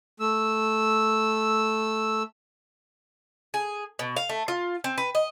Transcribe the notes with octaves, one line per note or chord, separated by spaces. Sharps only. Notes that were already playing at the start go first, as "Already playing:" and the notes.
A3 E6
G#4
B2
F5
A3
F4
C4
B4
D#5